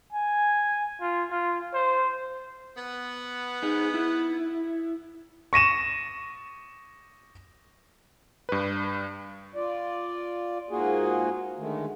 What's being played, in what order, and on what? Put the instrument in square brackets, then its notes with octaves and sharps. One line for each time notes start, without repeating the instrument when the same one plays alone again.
[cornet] G#5
F4
F4
C5
[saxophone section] B3
[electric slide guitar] D#4 G#4
E4
[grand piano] C#6 A#6 D#7 E7
[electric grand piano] G2 B4
[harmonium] F4 D5
G#2 A#3 F4 F#4 G#4
D3 D#3 G#3 A3